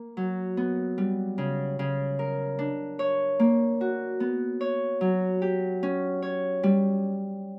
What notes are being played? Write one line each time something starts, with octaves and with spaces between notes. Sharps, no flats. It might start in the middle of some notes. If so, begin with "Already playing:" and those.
Already playing: A#3
F#3
B3
G3
C#3
C#3
A#4
D4
C#5
A#3
F#4
B3
C#5
F#3
G4
C#4
C#5
G3